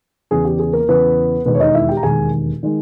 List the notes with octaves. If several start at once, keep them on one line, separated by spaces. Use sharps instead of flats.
E2 C#3 E3 G#4
G4
G#4
A#3 A#4
E2 C#3 E3 B3 B4
E1 D#2 D#3 G#3 B3 B4
C#5
D#4 D#5
E4 E5
G4 G5
A#5
E1 D#2 D#3 G#3 G#4 G#5
D#3 G#3